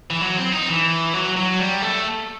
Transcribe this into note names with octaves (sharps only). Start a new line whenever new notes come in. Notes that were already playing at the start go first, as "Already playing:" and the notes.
E3
F#3
C4
D#4
E3
F#3
F#3
G3
A3